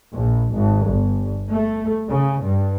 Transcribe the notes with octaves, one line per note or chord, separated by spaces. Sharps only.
A#1
G#1
G1
A3
C#3
G2